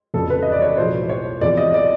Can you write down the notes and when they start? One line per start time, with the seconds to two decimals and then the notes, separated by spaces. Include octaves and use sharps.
0.14 F1 F2 C#3 A4
0.30 B4
0.42 D#5
0.52 D5
0.62 C#5
0.78 B1 A2 F3 G#3 C5
1.10 C#5
1.41 E2 C3 F3 D5
1.57 D#5
1.74 D5